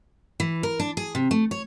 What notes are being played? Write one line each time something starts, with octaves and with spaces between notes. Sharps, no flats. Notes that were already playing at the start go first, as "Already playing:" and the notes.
E3
A#4
D4
G#4
C3
A3
C#5